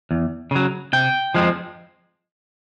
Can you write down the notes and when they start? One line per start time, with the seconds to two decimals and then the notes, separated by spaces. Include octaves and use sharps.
0.11 E2
0.51 C#3 F#3
0.93 C3 G5
1.34 F3 G#3 C4